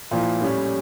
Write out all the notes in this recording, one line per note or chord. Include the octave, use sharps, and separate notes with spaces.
A#2 F3 A#3 E4
A2 G3 C#4 E4